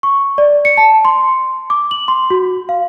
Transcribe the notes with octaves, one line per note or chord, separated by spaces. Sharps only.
C#6
D5
C#7
A5
C6
D6
F#7
C6
F#4
F5